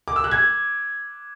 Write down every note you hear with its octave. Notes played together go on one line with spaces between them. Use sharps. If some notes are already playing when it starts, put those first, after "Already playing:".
D6
E6
F#6
G#6